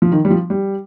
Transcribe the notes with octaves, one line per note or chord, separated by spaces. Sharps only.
F3
D#3
G3
F3
G3